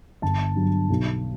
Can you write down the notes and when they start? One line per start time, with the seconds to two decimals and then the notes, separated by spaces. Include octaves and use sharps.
0.22 G1 A5
0.56 G2 F#3
0.90 B1